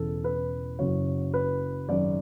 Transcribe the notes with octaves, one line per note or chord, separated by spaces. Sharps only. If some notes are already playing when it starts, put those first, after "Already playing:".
Already playing: E1 E2 C#3 A4
B4
F#1 F#2 C#3 F#3 C#5
B4
G#1 F#2 C#3 D5